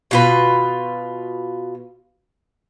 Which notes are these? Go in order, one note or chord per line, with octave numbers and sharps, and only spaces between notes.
B2 F4 B4